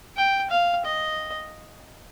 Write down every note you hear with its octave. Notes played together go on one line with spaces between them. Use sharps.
G5
F5
D#5